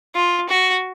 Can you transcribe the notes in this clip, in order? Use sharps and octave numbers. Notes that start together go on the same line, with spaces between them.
F4
F#4